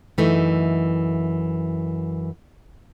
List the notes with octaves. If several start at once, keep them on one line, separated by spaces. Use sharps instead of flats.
F#2 E3 A3 D#4